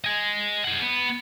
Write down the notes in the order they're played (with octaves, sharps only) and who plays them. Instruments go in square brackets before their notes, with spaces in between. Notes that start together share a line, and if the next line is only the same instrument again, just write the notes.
[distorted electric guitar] D#5 G#5
G#4 F#5
B3